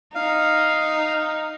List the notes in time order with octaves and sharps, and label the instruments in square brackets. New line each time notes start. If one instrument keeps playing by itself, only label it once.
[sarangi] D#4 [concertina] F5